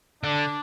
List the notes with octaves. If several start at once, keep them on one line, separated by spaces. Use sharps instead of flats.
D3 D4